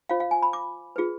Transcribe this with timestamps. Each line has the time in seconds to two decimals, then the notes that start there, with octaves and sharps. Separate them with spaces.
0.09 F4 C5 F5
0.20 F5
0.31 G#5
0.42 B5
0.53 D6
0.96 F4 G#4 B4